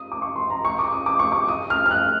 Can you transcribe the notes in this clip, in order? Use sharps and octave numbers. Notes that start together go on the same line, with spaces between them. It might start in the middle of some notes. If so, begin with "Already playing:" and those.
Already playing: D#6
D6
C#6
C6
A#5
C#6
D6
D#6
D6
C#6
D6
D#6
F6
F6
F#6